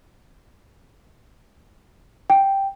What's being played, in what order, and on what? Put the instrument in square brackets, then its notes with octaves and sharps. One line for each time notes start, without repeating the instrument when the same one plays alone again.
[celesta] G5